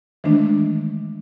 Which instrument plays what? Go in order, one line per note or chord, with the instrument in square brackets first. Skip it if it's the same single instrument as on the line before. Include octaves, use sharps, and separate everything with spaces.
[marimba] D#3 E3 G#3 A3 D4